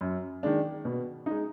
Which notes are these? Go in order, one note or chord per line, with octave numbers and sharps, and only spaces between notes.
F#2
D#3 G#3 D4
B2
G#3 D#4